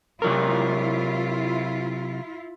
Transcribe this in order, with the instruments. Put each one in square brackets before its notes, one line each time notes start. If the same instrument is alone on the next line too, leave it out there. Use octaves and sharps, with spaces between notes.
[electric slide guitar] C3 F#3 A#4 [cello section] E4 F4